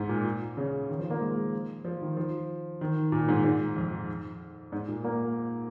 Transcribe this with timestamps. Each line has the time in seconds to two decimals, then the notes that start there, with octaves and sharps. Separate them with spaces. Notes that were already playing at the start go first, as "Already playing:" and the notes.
Already playing: G#2
0.09 A#2
0.57 C#3
0.89 D#3
0.99 F3
1.10 A#3
1.21 G#3
1.85 F3
2.02 D#3
2.17 F3
2.81 D#3
3.12 A#2
3.28 G#2
3.44 G#2
3.77 F2
4.72 G#2
4.88 A#2
5.04 A#3